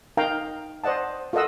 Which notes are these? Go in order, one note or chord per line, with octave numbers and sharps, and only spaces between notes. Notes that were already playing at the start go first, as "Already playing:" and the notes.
D#4 A#4 F5 G5 A#5
C5 D5 D#5 F#5 A5
F4 A4 A#4 D#5 F#5 E6